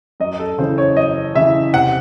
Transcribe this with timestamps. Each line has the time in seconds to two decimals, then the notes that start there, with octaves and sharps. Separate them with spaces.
0.20 F#2 D#5
0.39 A4
0.58 C#3 E3 C5
0.78 C#5
0.96 F#2 D#5
1.35 C#3 E3 E5
1.73 C3 F#5